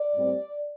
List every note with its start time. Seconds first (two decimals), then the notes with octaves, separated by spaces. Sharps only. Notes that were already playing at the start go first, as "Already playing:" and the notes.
Already playing: D5
0.13 A2 G3 C4